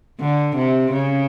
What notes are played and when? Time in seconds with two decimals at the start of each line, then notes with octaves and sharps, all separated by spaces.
0.20 D3
0.56 C3
0.91 C#3